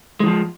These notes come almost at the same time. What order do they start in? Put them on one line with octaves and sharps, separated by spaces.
G#3 E3 F3